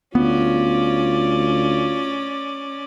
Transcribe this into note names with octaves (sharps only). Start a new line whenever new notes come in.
D2 B3 C#4 F4 D5